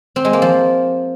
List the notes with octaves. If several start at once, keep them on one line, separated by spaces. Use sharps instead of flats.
C4
G#3
A#3
F3